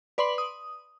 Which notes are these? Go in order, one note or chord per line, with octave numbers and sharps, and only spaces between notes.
B4 D5 B5 C6 F#7
D#6